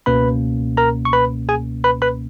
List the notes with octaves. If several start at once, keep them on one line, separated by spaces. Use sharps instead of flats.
C#2 B2 A#3 C#4 B4 B5
A#4 A#5
C#6
B4 B5
G#4 G#5
B4 B5
B4 B5